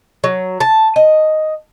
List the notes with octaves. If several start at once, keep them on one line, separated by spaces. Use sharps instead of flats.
F#3
A5
D#5